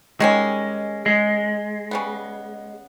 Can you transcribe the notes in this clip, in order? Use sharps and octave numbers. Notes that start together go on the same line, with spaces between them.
D#3 G3 G#3 C#4
G#3
C#3 G3 B3